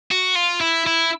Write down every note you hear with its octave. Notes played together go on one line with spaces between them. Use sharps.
F#4
F4
E4
E4